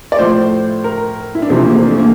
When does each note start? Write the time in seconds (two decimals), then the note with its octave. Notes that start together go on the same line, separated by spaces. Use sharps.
0.12 D5
0.19 A2 F3 A3 C5
0.84 A#4
1.35 E4
1.42 D4
1.49 E2 C3 F3 C4
1.58 A3
1.66 A#3
1.75 C4
1.83 D4
1.91 A3
1.99 A#3